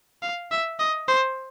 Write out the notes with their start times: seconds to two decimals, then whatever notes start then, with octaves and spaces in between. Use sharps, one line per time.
0.22 F5
0.51 E5
0.79 D#5
1.08 C5